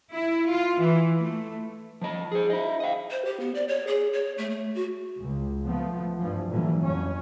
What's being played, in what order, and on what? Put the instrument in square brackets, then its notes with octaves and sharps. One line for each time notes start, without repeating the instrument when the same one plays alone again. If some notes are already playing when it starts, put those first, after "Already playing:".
[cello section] E4
F4
E3
A3
[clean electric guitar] F3 D#5
G#4 C5
E4 D#5
D#5 F5
[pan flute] C5
G4
B3
D5
C#5
G#4
C#5
A3
A3
F#4
[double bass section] C#2
F3 A3 B3
G2 E3 F3
A#2 D3 E3 F#3 G3
F2 C#4